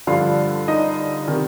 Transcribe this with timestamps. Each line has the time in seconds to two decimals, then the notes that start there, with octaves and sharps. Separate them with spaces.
0.07 G2 D3 F3 F4 F5
0.68 D#4 D#5
1.28 C3 D#3